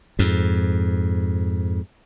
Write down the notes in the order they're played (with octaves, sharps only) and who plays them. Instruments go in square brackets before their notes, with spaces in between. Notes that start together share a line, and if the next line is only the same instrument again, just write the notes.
[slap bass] F2 G#2